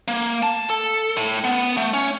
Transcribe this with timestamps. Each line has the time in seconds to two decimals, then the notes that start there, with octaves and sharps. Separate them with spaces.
0.08 A#3
0.43 A5
0.70 A4
1.17 A2
1.44 B3
1.77 A3
1.94 C#4